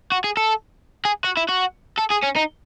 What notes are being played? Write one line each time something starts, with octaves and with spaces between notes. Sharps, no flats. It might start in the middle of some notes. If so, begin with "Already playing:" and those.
F#4
G#4
A4
G#4
F#4
E4
F#4
A4
G#4
C#4
D#4